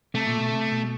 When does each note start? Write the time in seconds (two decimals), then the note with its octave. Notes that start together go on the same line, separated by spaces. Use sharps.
0.14 C3 A3
0.26 A#2
0.40 B2
0.52 C3
0.71 B2